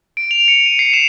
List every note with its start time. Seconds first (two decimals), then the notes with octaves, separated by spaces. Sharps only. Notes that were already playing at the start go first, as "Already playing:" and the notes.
0.17 D7
0.31 F7
0.48 C#7
0.66 D#7
0.79 C7
0.93 E7